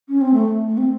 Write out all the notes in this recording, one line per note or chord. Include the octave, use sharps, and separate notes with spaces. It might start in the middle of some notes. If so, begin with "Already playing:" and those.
C#4
C4
A3
A3
C4